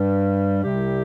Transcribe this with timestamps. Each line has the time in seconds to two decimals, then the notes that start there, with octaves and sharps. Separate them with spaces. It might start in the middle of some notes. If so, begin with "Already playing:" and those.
Already playing: G2 G3
0.62 C2 C3 G3 G4